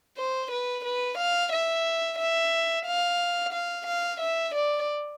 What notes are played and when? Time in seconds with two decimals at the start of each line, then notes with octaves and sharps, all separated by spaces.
0.18 C5
0.52 B4
0.84 B4
1.18 F5
1.52 E5
2.19 E5
2.86 F5
3.53 F5
3.87 F5
4.20 E5
4.55 D5